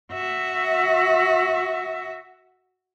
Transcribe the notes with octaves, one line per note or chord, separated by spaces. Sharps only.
F#4 E5